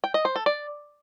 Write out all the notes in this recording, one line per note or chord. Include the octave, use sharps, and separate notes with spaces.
G5
D#5
C5
A4
D5